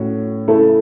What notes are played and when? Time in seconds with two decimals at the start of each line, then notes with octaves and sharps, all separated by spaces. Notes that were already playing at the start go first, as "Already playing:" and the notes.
Already playing: A2 A3 C#4 F#4
0.48 C#3 A3 E4 A4